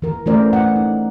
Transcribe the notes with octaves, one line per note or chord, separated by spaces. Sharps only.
E3 A#4
E3 A3 C#4 A#4 C5 D5
F#5
D#4